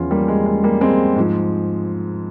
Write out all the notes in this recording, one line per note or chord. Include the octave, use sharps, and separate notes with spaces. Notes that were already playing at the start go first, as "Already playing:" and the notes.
Already playing: E2 C#3 F3 C#4 F4
G3 A#3
G#3
G#3
G3 A#3
G#3 C4
G#2 F3